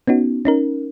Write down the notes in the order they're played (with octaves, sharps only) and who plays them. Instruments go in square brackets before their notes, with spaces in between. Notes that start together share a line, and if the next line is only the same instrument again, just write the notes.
[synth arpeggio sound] B3 C#4 D#4 F#4
C#4 D#4 A#4